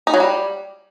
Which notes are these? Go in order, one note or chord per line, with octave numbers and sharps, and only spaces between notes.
D#4
F#3
G3